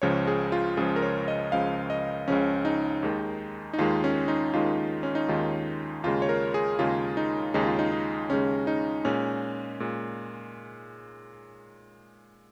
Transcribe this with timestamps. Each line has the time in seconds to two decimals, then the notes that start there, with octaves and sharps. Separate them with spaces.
0.02 C#2 C#3 F3 C#5
0.27 G#4
0.52 F4
0.77 C#2 C#3 F3 G#4
0.96 A#4
1.02 C#5
1.28 D#5
1.52 C#2 C#3 F3 F5
1.90 D#5
2.28 C#2 C#3 F3 C#4
2.65 D#4
3.03 D#2 D#3 G#3
3.73 D#4
3.78 D#2 D#3 G#3 F4
4.04 C#4
4.28 D#4
4.53 D#2 D#3 G#3 F4
5.03 C#4
5.15 D#4
5.28 D#2 D#3 G#3 F4
6.04 D#2 C#3 G#3 F4
6.22 C#5
6.29 A#4
6.54 G#4
6.79 D#2 C#3 G#3 F4
7.17 D#4
7.54 D#2 C#3 G#3 D#4
7.66 F4
7.79 D#4
7.92 D#4
8.30 D#2 C#3 G#3 C#4
8.67 D#4
9.05 A#2 G#3 C#4
9.80 A#2 G#3